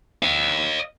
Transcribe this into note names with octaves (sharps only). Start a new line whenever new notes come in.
D#5 F5